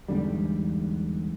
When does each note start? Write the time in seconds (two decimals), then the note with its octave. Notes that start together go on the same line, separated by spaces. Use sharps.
0.08 E2 G#2 D3 G3